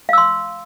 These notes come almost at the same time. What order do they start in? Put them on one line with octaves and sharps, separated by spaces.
F5 E6 C6